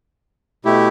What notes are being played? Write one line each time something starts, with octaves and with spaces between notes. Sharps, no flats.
B2 A3 E4 G4